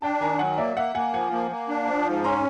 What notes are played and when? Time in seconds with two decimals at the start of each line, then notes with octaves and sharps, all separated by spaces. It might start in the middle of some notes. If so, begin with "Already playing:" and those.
0.02 D4 G5 A5
0.21 D#3 G#5 A#5
0.39 F#3 F#5 G#5
0.57 A#3 D5 E5
0.77 A#3 E5 F#5
0.94 A#3 F#5 G#5
1.13 F3 F#5 G#5
1.32 A#3
1.51 A#3
1.68 D4
1.87 F3
2.06 G#2
2.24 C#4 A#5 C6